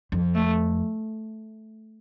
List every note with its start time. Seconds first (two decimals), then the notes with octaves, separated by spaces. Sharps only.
0.12 F2
0.35 A3